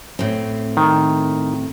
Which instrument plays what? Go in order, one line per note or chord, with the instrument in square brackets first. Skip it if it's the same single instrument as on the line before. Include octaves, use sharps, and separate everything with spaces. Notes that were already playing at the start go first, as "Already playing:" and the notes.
[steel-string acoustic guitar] A2 C4
[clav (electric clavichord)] D#3